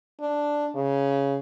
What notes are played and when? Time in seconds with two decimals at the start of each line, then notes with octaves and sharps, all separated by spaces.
0.21 D4
0.75 C#3